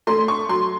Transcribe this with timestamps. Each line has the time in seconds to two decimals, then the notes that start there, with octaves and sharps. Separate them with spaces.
0.07 A3 C6
0.28 C#6
0.49 F#3 C6